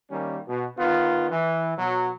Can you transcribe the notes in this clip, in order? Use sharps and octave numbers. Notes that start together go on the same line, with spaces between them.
D#3 G3 A#3 C#4
B2
D#3 B3 F4
E3
B2 F#3